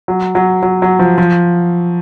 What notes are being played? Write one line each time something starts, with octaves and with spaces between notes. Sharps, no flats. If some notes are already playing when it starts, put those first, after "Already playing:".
F#3
F#3
F#3
F#3
F3
F3